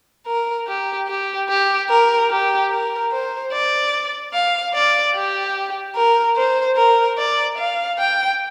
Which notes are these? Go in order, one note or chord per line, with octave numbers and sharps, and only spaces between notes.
A#4
G4
G4
G4
A#4
G4
A#4
C5
D5
F5
D5
G4
A#4
C5
A#4
D5
F5
G5